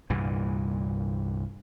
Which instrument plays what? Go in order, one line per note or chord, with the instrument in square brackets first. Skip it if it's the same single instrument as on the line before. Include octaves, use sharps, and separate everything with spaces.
[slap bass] C2 G2 A#2 E3